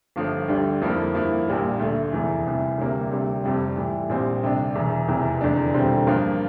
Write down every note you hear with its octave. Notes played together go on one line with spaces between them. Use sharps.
G1 G2 F3 A3
D2 D3 G3
F2 D3 F3 A#3 E4
G2 F3 A#3 E4
A#1 A#2 G3 A#3
D2 D3 A3
F1 E2 E3 A3
C2 C3 E3
D2 C3 G3 A#3
D2 C3 G3
F1 F2 C3 G3
A2 E3 G3
A#1 A#2 G3 C4 G4
D2 C3 G3 D4
E1 E2 E3
F1 E2 C3 E3
F1 E2 D3 A3 D4
E1 D2 D3 G3 C4
G2 F3 A#3 F4